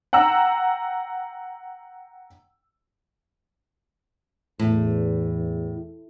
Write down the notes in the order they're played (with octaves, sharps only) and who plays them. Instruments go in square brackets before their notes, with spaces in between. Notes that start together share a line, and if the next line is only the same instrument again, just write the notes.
[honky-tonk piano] F#5 G5 A#5 E6
[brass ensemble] E2 [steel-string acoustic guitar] A2